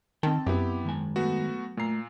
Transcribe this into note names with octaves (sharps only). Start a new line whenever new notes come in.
D#3 C4 D#5 G5 A5
F#2 B3 E4 G4
D#3 G#3 G#5
A3 B3 F#4
A#2 A3 A#5 C7